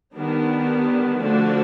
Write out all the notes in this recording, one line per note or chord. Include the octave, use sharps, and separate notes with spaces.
D#3 G3 B3 D4
D3 F3 A3 D4 F#4